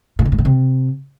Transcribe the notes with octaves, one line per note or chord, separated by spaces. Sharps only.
A#2
B2
G#2
A#2
C3